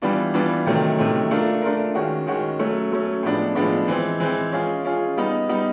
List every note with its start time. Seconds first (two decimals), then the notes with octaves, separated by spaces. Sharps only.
0.02 E3 G3 B3 D4 F4
0.34 E3 G3 B3 D4 F4
0.66 C3 D#3 F#3 A3 C#4
0.98 C3 D#3 F#3 A3 C#4
1.31 A3 D4 F4 A#4
1.62 A3 D4 F4 A#4
1.95 D#3 G#3 C#4 F#4
2.27 D#3 G#3 C#4 F#4
2.59 F#3 A3 C#4
2.91 F#3 A3 C#4
3.23 A2 F3 G#3 B3 D4
3.55 A2 F3 G#3 B3 D4
3.88 E3 G#3 C4
4.20 E3 G#3 C4
4.51 G#3 C#4 F4 G#4
4.84 G#3 C#4 F4 G#4
5.17 G3 B3 D#4
5.49 G3 B3 D#4